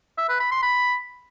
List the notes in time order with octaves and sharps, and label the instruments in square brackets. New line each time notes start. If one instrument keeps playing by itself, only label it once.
[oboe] E5
B4
B5
C6
B5